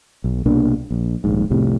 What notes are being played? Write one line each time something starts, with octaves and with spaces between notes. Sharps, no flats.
B1
C2 B2 A#3 D4
A#1
D#1 A#1 G#2
C2 F2 A2 C3